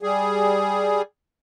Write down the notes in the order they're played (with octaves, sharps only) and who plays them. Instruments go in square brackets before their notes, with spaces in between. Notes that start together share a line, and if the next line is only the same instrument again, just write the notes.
[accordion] G3 G#4